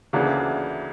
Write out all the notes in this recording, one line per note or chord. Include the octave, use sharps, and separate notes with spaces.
D2 C#3 E3 A#3 D4